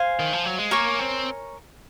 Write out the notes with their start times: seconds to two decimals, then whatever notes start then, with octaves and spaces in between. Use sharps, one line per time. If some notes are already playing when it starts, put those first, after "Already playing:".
Already playing: C5 F5 G#5
0.19 D#3
0.33 F3
0.45 F#3
0.58 G#3
0.71 A#3 A#4 C#5 G#5 C#6
0.99 C4